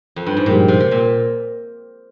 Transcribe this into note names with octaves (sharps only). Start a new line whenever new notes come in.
F2
G2
G#2
G2 A#2 F3 G#3 D#4 G4
C3
C3
A#2